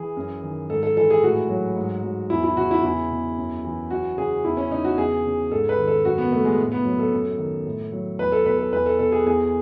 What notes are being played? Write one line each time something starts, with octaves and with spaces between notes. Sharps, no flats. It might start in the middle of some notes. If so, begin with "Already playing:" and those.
Already playing: E3 G#4
F#2
D#3
G#2 A4
A4
E3 A4
G#4
A2 F#4
F#3
G#2
F#3
E2 E4
E4
C#3 F#4
E4
E2 E4
B2
F#2
E3
F#2 F#4
C#3 G#4
E2 E4
C#4
C#3 D#4
F#4
E2 G#4
C#3
G#2 A4
B4
D#3
A4
F#2 F#4
B3
C#3 A3
G#3
A2
B3
F#3
A4
F#2
D#3
A2
F#3
E2 B4
A4
B2 B4
A4
E2 B4
A4
B2 A4
G#4
E2 G#4